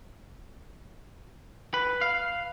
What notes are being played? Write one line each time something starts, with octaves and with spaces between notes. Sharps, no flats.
B4
F5